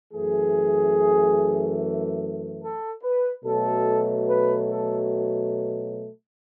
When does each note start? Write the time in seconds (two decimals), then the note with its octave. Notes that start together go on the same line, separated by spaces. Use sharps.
0.12 F#2 E3 A3 G#4
2.61 A4
3.02 B4
3.44 B2 F#3 A3 A4
4.27 B4
4.68 A4